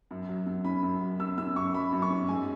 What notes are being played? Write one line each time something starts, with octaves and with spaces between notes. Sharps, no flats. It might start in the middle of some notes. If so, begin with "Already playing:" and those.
F#2
F#3
F#2
C#4 B5
F#2
F#3
F#2 E6
C#4 E6
F#2 C#6
F#3 B5
F#2
C#6
C#4
G#2 G#5